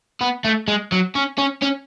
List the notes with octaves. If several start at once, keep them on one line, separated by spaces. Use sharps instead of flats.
B3
A3
G#3
F#3
C#4
C#4
C#4